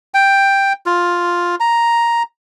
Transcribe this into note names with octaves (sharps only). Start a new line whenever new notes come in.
G5
F4
A#5